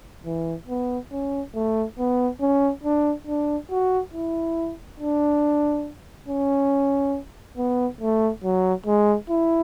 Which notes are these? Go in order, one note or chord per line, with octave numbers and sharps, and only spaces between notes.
E3
B3
C#4
A3
B3
C#4
D4
D4
F#4
E4
D4
C#4
B3
A3
F#3
G#3
E4